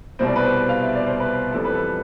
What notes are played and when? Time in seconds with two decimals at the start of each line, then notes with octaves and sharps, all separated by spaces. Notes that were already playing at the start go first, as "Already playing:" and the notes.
0.19 C2 B2 G3 C4 C5
0.27 D5
0.36 B4
0.44 C5
0.69 F5
0.82 E5
0.95 D5
1.07 C5
1.20 B4
1.52 F2 E3 G3 A4
1.64 B4
1.75 A4